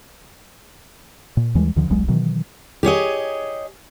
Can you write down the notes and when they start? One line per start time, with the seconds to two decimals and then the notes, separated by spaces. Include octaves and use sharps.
1.37 A#2
1.55 D#2 E3 G3 G#3
1.76 D2 D3 D#3 F3
1.89 D#1 B1 F#3 G#3
2.08 B2 D#3 E3 F#3
2.83 G4 G#4 C#5 D#5